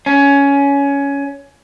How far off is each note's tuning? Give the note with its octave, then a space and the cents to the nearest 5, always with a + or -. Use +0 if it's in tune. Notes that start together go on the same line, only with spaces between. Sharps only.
C#4 +15